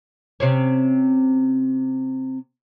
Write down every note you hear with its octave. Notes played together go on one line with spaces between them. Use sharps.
C3 C4 C#4